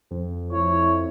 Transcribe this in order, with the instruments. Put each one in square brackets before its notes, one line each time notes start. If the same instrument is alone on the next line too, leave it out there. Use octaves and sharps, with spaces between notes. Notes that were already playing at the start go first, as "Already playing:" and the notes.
[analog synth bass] F2
[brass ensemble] F3 A3 E4 [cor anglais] C#5